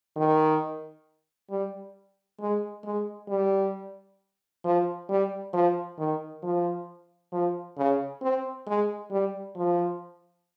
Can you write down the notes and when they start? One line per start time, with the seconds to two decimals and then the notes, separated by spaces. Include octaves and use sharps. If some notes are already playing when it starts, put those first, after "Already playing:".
0.16 D#3
1.50 G3
2.40 G#3
2.84 G#3
3.29 G3
4.64 F3
5.09 G3
5.53 F3
5.98 D#3
6.43 F3
7.32 F3
7.77 C#3
8.22 C4
8.67 G#3
9.11 G3
9.56 F3